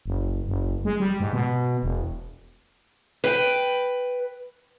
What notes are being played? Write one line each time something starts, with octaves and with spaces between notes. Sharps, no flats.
F#1
F#1
G#3
G3
G#2
B2
E1
B4 G5